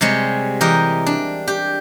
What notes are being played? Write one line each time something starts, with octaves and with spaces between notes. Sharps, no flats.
C3 G3 G#3 C#5
E3 G4 A#4 D#5
D4
G4